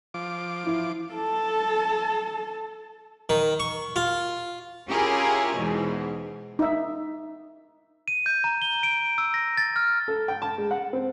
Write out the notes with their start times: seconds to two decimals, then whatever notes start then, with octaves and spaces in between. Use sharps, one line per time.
0.14 F3 D6
0.63 E3 E4
1.13 A4 A5
3.29 D#3
3.60 C#6
3.96 F4
4.89 C#4 E4 F4 G4 G#4 A#4
5.56 E2 G#2 B2 E3
6.59 D#4 E5
8.08 D#7
8.26 G6
8.44 A#5
8.62 G7
8.83 D7
9.18 E6
9.34 A#6
9.57 A6
9.76 F6
10.08 A4
10.28 G5
10.42 A5
10.58 G#3
10.71 F#5
10.93 C4